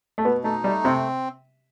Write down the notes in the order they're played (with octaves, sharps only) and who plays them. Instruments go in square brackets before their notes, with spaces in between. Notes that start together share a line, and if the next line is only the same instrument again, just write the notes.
[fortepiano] A3
[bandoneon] B2 [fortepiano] B3
[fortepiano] A3 [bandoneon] D#4
[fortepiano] G3 [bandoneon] A3
[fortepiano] C3 [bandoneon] C4